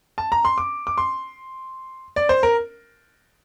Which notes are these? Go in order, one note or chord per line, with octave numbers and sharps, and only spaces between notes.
A5
A#5
C6
D6
D6
C6
D5
C5
A#4